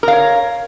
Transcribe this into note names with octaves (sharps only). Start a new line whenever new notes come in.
A#4 C#5 F5